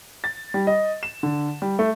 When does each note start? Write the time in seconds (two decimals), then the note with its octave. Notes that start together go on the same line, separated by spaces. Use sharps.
0.24 A6
0.54 G3
0.67 D#5
1.03 E7
1.23 D3
1.62 G3
1.79 A3